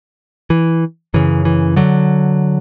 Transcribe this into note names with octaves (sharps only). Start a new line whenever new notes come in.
E3
F#2 C#3 E3
E3
D3 F#3